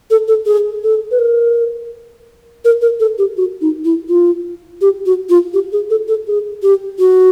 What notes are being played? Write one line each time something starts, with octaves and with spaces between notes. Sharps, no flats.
A4
A4
G#4
A4
B4
A#4
A#4
A#4
A4
G4
F#4
D#4
E4
F4
G4
F#4
F4
G4
G#4
A4
A4
G#4
G4
F#4